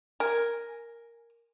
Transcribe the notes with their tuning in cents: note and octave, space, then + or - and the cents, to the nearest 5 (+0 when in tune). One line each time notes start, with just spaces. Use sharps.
A#4 +0 G#5 +0